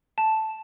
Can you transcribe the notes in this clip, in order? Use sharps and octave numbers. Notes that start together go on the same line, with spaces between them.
A5